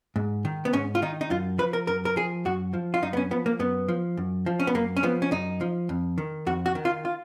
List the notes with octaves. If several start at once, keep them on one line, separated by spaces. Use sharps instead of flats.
G#2
D#3
B3
G#2 C#4
F4
D#3 D#4
D#4
F#2 F4
F3 B4
A#4
F#2 A#4
A#4
F3 G#4
F#2 F#4
F3
F4
F#2 D#4
B3
C#4
F3 B3
A#3
F#2 B3
F3
F#2
F3
C#4
B3
F#2 A#3
C#4
F3 B3
C#4
F#2 D#4
F3
F2
D#3
F2 F#4
F#4
D#3
F4
F4